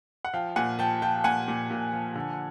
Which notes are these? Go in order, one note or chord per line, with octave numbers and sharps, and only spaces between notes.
F#5
F3 F5 G5
A#2 F#5 G#5
F3 G5 A5
F3 G5 A5
A#2 F#5 G#5
A#2
A#2
F3
D3